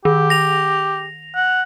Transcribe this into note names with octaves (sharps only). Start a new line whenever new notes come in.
D#3 G4
A#6 F7
F#5